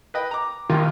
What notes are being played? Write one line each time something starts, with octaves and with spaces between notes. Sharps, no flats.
B4 D#5 G5
A#5 D6
A#1 D#2 D#3 F4